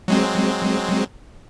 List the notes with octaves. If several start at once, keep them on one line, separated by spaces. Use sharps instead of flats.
F#3 G#3 C4